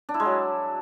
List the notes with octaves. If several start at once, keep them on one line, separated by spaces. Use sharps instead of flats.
D4
E4
G#3
F#3